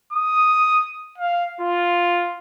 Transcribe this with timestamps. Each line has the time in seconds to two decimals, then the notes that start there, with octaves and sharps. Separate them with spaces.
0.13 D#6
1.18 F5
1.61 F4